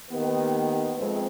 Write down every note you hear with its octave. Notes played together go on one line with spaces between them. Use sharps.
D#3 A#3 B3 G4 B4
F2 G#3 A3 C4